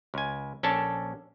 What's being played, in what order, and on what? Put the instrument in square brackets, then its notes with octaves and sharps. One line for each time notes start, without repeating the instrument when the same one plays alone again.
[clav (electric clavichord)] C#2 G#5
A#1 C#4 D4 A4 A5